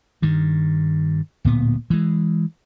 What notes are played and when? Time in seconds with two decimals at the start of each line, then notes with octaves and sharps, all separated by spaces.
0.22 G2 D#3
1.45 D1 A#2 B3
1.90 E3 G#3